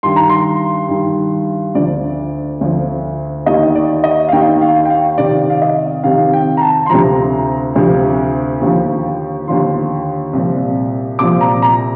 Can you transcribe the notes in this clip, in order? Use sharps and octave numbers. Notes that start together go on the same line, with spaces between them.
G2 D#3 C6
A#5
C6
G2 D#3
D2 D3 F3 D5
D2 D3 F3
D#2 D#3 D#5
D5
D#5
F5
D#2 D#3 G5
F5
G5
F5
F2 C3 D#3 D5
F5
D#5
F2 C3 D#3 F5
G5
A#5
A5
C6
D2 C3 F3 A#5
D2 C3 F3
D#2 D3 F3
D#2 D3 F3 C6
C2 A#2 F3
C2 A#2 F3 D6
A#5
A#5